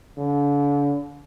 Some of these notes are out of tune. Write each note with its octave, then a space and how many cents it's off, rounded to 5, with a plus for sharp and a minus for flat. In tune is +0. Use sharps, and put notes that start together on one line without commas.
D3 -40